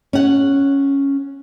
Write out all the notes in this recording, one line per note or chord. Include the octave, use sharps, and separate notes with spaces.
C#4 F#5